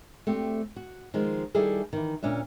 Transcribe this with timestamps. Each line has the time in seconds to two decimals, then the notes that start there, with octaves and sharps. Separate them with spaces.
0.27 A3 C4 D4 F#4 G4
0.76 F#4
1.14 D#3 F3 G#3
1.55 D#3 G3 E4 G#4 A4
1.93 D#3 E3
2.23 D2 A#2 C#4 D4 E5